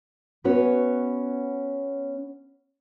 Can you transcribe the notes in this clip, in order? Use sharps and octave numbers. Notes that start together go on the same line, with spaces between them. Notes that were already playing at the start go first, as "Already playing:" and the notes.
B3 C#4 F#4 B4 C#5